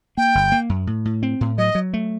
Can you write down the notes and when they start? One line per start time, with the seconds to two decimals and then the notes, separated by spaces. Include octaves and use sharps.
0.17 A#3 G5
0.35 G1
0.52 A#3
0.69 F#2
0.87 A2
1.05 A2
1.23 C4
1.41 A2
1.57 F#3 D#5
1.75 F#3
1.94 A3